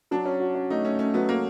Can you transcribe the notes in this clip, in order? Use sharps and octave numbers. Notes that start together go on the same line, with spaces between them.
F#3 D4
C#4
F#4
C#4
A3 D#4
A3 C#4
A3 C#4
F#3 B3
A3 A#3